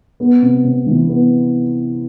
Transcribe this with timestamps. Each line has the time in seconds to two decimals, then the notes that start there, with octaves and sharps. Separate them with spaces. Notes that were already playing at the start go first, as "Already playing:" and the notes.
0.20 B3
0.42 C3
0.65 C3
0.87 E3
1.09 B3